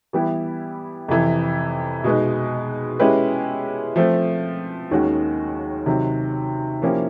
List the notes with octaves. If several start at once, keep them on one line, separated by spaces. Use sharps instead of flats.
E3 G3 B3 E4 G4
F2 C3 E3
B2 G#3 B3 D#4
G#3 C#4 E4 G4 B4
F3 A3 C4
D#2 D#3 G#3 C#4 F#4
C3 D#3 F#3
F3 A#3 C#4 E4 G4